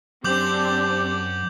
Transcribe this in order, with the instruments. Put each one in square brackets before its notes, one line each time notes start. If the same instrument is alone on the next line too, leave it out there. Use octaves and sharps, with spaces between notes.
[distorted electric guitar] F#2 [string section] C4 D4 [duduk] G4 [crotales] D6 G6 F#7